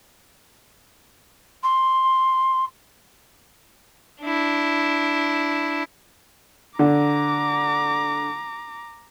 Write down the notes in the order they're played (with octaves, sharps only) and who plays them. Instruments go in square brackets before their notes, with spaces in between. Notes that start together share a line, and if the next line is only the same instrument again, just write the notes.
[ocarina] C6
[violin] D4 E4
[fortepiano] D3 [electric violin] A#5 D6